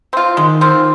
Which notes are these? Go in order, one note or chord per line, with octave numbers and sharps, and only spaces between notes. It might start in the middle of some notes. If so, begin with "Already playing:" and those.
C4 F4
D#3 G#3
C4 F4